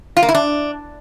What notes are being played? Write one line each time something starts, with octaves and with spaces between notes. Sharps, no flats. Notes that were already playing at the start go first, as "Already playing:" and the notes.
F4
A#3
E4
D4